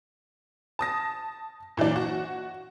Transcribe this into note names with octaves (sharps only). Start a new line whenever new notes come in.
A5 D#6 A#6
A#2 E3 F#3 D4
F#4